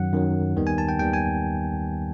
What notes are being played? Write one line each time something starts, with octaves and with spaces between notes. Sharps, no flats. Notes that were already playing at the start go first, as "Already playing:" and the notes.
Already playing: F#2 D#3 F#3 F#5
F#2 D#3 F#3
D#2 D#3 G3 B3
G#5
A5
G5
D#2 D#3 G3 B3 G5
G#5